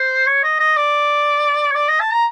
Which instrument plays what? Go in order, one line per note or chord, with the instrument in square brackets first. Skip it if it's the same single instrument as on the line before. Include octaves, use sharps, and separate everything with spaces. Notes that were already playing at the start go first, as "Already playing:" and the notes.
Already playing: [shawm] C5
C#5
D#5
D#5
D5
C#5
D5
D#5
A5
A#5